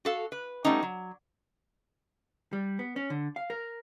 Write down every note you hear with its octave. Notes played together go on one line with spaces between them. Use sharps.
F#4 A4 F5
B4
G3 A3 B3 C#4 D#4
F#3
G3
B3
C#4
D3
F5
A#4